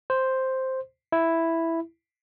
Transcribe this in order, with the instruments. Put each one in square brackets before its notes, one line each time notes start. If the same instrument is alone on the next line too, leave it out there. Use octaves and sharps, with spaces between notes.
[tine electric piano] C5
E4